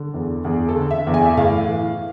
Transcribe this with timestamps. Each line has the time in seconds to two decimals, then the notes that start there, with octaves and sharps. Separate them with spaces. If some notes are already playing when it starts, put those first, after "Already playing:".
Already playing: D3
0.14 E2
0.45 E2 G#4
0.69 A4
0.76 D3
0.91 E5
1.07 E2
1.14 G#5
1.25 E5
1.37 A2 F5
1.68 E3